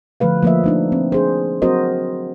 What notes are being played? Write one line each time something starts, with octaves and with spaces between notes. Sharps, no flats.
D3 F3 A3 B4 F5
F3 A3 A#3 B4 D#5 E5
A3 D4 D#4
C4
D4 G#4 C5
F#3 C4 F#4 A#4 C5 D#5